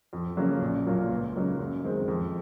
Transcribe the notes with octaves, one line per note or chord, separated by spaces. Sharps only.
F2
C#3 F#3 A#3 C#4
A#1
A#2 F#3 A#3 F4
C#2
C#3 F#3 A#3 D#4
F#2
D#3 G#3 C4
F2